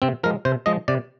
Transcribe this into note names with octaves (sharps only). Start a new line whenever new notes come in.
C3 C4
F3 G#3 A#4
C3 C5
F3 G#3 D#5
C3 D5